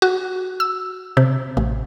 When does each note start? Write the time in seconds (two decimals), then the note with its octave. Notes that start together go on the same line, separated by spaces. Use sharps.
0.02 F#4
0.60 E6
1.17 C3
1.57 A1